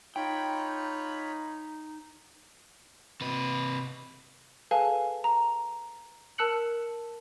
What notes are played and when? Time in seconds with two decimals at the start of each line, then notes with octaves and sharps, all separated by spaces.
0.16 D#4 F4 C#5 G5 B5
3.21 C3 B4
4.71 G#4 A4 B4 F5 G#5 A5
5.24 A#5
6.38 A#4 A5 E6 F#6 C#7 F#7